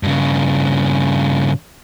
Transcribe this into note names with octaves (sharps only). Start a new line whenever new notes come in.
G2 C#3